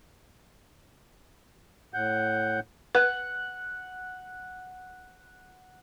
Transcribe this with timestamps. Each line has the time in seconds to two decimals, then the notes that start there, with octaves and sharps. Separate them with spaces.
1.94 A2 F#5 G6
2.95 B4 F#5